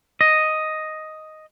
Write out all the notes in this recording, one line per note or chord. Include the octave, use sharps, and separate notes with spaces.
D#5